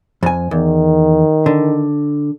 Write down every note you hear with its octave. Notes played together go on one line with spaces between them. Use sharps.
F2 G#5
E2 D#3
D3